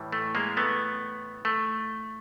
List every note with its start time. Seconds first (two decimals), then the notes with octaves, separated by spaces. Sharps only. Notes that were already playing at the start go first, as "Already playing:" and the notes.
Already playing: A2 E3 G3
0.12 A3
0.35 G#3 A#3
0.57 A3 B3
1.45 A3